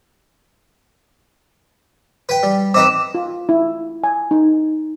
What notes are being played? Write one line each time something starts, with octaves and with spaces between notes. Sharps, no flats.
B4 G5
G3
C4 D#4 B4 D6
F4
E4
G#5
D#4